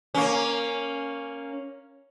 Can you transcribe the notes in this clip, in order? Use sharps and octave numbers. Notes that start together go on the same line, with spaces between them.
A#3 C#4